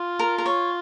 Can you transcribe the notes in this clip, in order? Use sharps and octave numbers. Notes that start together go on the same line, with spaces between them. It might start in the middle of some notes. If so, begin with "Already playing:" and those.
Already playing: F4
A#4
A#4
C#5